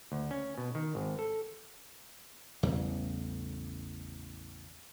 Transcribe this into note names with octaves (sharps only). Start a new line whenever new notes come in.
D2
C#4
B2
D#3
G#1
A4
A1 E2 C#3 G3